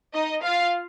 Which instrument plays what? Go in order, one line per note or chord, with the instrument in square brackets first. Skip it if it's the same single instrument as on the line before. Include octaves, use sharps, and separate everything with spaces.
[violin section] D#4 D#5
F4 F5